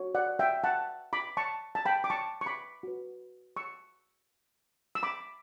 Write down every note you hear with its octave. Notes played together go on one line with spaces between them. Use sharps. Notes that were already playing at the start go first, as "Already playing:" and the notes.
Already playing: F#4 A4 C#5
D5 F#5
E5 G5
F#5 A5
B5 D6
A5 C#6
A5
G5 B5
D6
A5 C#6
C#6
B5 D6
F#4 B4
C#6 E6
E6
B5 D6